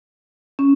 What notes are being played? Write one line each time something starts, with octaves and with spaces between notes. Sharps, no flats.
C#4